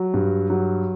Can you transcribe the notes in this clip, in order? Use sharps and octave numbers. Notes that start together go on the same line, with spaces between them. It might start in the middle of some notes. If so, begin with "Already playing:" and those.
Already playing: F#3
G2
F#3